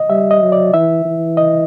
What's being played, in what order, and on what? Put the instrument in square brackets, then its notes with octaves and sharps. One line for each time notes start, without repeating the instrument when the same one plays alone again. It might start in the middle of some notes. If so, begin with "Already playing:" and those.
Already playing: [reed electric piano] D#5
[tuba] G3 [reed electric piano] E5
[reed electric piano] D#5
[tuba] F#3
[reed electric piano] D5
[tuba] E3 [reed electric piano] E5
[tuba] E3
[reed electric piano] D#5